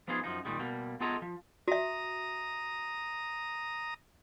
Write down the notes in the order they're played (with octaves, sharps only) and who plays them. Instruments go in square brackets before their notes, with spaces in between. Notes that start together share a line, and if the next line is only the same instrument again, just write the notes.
[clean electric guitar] F3 B3 D#4 F4 G#4
F#2 F3 D#4
A#2 D#3 G3 G#3
B2 G3 A#3
B3 F4 G#4 A4 D#5 A#5
F3
[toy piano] F#4 E5 [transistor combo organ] A#5 D#6